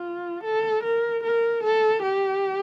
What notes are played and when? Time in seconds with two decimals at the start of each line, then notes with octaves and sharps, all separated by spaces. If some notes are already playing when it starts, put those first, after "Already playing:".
Already playing: F4
0.44 A4
0.83 A#4
1.23 A#4
1.63 A4
2.03 G4